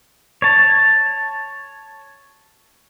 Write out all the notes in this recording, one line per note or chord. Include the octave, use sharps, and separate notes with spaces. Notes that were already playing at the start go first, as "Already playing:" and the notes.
C#5 A5